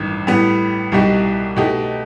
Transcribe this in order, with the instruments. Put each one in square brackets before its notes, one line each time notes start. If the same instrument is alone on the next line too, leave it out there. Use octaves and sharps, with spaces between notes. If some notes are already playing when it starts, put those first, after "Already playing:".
Already playing: [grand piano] A1 G2 D#3
A2 G3 B3
C2 B2 G3 D#4 G4
B2 A3 D#4 G4